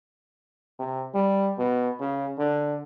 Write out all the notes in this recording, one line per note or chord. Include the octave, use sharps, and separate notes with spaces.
C3
G3
B2
C#3
D3